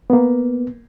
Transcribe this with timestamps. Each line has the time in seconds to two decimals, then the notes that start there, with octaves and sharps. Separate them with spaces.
0.10 A#3 B3